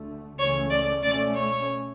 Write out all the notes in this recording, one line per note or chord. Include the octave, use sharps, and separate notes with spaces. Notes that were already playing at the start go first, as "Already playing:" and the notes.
Already playing: D2 D3 A3
C#2 C#3 E3 A3 C#4 C#5
D5
B2 A3 C#4 D5
C#5